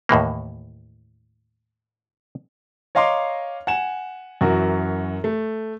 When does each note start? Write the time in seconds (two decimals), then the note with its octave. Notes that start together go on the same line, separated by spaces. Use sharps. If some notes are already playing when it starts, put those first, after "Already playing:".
0.09 D#2 A2 E3 A#3
2.95 C#5 D#5 F5 A#5 C6 D6
3.67 F#5 G#5 E7
4.41 F#2 E3 F#4 A#4
5.24 A3